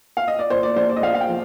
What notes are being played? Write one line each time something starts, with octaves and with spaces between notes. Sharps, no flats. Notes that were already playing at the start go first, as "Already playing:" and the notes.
F5
D#5
D5
A#2 C5
D5
A#1 C5
D5
D#5
A#1 F5
F5
G5
F3